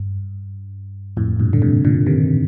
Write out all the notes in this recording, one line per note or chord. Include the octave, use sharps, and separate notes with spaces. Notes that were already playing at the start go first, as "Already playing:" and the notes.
Already playing: G2
F2 A2
G2 A#2
D3
A2 C3
A#2 D3
C3 D#3